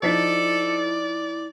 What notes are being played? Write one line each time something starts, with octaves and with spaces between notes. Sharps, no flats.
F3 D#4 E4 A4 D5 B6